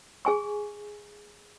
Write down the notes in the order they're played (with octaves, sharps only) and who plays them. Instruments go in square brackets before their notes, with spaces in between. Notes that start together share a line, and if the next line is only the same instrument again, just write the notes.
[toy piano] G#4 G#5 C#6